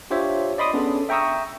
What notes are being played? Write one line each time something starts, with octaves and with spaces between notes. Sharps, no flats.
D4 F4 G4 C5 C#5 E5
D5 D#5 B5 C6 D6 D#6
B3 C#4 D4 G#4 A4
E5 G5 A#5 C#6 D#6 E6